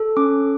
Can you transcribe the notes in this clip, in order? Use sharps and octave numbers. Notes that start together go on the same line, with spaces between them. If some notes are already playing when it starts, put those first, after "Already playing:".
Already playing: A4
C#4 D6